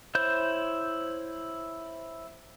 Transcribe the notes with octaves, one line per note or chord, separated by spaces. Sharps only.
E4 C5 C#5 G6